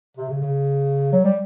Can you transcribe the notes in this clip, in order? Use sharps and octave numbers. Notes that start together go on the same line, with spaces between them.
C3
C#3
C#3
F#3
G3